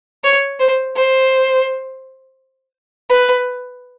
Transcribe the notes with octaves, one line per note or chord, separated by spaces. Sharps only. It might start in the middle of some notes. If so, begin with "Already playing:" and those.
C#5
C5
C5
B4